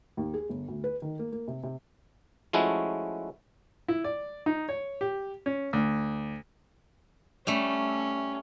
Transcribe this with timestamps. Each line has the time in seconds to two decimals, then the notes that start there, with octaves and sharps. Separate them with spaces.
0.17 D#2
0.34 G#4
0.49 G1
0.68 D2
0.84 B4
1.02 D#3
1.19 A#3
1.32 A#3
1.48 C3
1.64 C3
2.53 F3 G#3 A3 C#4 E4 F#4
3.88 E4
4.04 D5
4.46 D#4
4.69 C#5
5.01 G4
5.46 C#4
5.73 D2
7.47 G3 A3 C#4